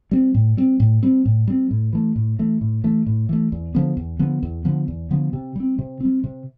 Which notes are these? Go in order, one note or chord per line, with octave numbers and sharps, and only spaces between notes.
G3 C4
A2
G3 C4
A2
G3 C4
A2
G3 C4
A2
E3 A3
A2
E3 A3
A2
E3 A3
A2
E3 A3
E2
D3 F3 B3
E2
D3 F3 B3
E2
D3 F3 B3
E2
D3 F3 B3
C3
G3 C4
C3
G3 C4
C3